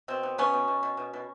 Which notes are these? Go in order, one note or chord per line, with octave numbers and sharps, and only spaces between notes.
B2 C4
B3
B2 B3 C#4
B2
B2
B2
B2
B2